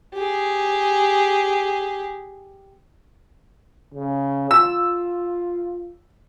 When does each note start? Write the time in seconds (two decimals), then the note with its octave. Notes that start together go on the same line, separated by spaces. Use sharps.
0.15 G4 G#4
3.94 C#3
4.51 F4 E6